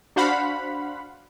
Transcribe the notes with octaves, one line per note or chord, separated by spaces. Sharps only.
D4 F#4 C5 F5 F#5 B5